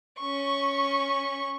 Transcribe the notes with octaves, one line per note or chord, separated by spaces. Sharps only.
C#4 C#6